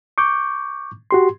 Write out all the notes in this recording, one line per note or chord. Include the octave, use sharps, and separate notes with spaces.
C#6 D6 G6
F#4 G4 C6